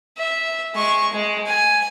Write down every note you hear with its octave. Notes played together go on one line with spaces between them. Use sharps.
E5
G#3 C#6
G#3
G#5